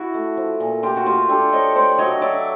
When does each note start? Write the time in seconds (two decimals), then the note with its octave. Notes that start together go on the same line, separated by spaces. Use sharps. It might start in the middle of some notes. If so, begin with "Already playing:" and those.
Already playing: E4 F#4
0.14 A3
0.37 F3
0.60 A#2
0.83 A3 F4 G4
0.97 F#4
1.06 A3 F4 G4
1.29 D4 G4 A4
1.52 F3 C#5 D#5
1.75 A3 C5 D5
1.98 F#3 C#5 D#5
2.11 D#5
2.21 F#3 D5 E5